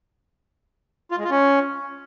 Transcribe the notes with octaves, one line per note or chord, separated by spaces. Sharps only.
F4
G#3
F4
C#4